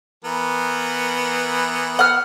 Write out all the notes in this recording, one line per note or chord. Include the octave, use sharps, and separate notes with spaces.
E3 B3 A#4
F#5 F6